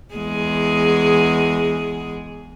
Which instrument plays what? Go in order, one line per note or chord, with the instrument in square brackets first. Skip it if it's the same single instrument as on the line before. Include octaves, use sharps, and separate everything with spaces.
[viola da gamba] E2 G#3 G#4